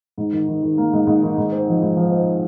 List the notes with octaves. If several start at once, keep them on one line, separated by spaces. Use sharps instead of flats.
G#2
D#3
D#3
D#3
A#3
G#2
G#2
D#3
G#2
C4
F3
G#2
F3
C4